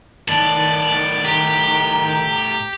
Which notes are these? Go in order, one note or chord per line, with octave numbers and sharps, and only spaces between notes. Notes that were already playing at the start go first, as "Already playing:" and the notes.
A2 D#3 B3 D5 A5
G4 A#5